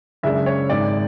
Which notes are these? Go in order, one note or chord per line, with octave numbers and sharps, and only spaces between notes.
F#2 C#3 G#3 D4 E5
C#5
G#1 G#2 G#3 D5